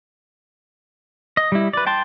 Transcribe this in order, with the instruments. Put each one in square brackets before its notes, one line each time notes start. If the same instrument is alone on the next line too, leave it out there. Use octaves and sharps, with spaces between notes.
[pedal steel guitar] D#5
G3 E4
B4 D5
G5 A5 C6